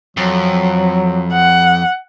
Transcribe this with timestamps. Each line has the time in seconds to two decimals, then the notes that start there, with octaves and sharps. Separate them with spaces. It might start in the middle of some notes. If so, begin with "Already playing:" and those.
0.17 F2 F#3
1.33 F#5